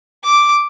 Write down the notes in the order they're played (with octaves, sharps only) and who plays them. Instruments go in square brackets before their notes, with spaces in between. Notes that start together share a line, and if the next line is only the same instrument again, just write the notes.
[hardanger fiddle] D6